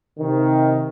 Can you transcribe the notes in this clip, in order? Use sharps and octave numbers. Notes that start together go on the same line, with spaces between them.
C3 D#3